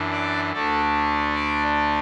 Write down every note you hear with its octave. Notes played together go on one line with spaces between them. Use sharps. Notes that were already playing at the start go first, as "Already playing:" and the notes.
Already playing: F#2 E3 D4
D5
D2 D3 A3 D4 A4
D5